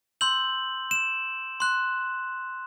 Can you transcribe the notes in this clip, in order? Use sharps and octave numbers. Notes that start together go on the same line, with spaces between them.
C6 E6 G6 F#7
E7
C6 F#6